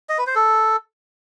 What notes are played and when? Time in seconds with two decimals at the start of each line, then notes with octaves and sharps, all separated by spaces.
0.09 D#5
0.18 B4
0.27 C5
0.36 A4